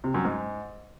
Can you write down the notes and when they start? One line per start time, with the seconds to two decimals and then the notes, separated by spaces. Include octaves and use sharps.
0.04 C3
0.14 F#2
0.25 G#2